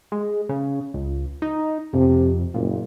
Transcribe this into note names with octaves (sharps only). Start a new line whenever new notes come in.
G#3
C#3
C#2
D#4
F2 C3
F#1 A#2